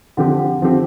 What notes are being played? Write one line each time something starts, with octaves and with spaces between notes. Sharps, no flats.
D3 F3 C4 G4
D3 F3 C4 G4